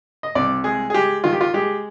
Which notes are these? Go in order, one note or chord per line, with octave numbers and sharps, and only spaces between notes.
D#5
C2 D5
G#3 G#4
G#4
G#3 G4
D#3 F4
G4
F4
G#3 G4